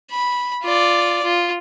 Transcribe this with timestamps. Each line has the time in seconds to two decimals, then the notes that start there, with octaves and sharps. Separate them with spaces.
0.11 B5
0.63 F4 D5
1.24 F4